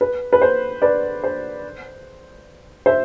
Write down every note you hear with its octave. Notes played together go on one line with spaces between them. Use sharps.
B4
B4
C5
B4 D5
C5
C5 E5